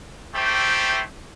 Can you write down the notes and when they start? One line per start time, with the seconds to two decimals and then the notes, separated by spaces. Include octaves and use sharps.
0.34 A3 E4 G4 C5 G5